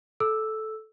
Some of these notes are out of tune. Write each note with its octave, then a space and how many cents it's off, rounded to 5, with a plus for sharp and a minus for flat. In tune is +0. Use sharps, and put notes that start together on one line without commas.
A4 -10 E6 +0